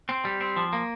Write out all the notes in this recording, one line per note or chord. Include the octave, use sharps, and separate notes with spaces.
C4
G3
C4
F3
A#3